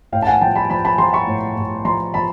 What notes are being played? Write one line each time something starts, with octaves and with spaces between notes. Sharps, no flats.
A2 F5 G5
A5
F#5 G#5
F3 G5 A5
A5 B5
F3 A5 B5
A5 B5
F3 A#5 C6
B5 C#6
A2
A2
F3 A#5 C6
F3 A5 B5